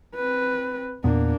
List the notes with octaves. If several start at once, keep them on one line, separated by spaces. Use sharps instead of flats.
C4 B4
E2 A#2 A#3 B3 D4